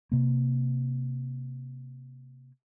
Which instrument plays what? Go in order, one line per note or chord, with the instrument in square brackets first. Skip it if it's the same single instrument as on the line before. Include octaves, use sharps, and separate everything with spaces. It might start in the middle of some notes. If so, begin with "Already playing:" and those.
[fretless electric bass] C3 A#3